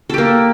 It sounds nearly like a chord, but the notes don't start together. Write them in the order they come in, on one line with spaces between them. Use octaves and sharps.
A4 G4 A#3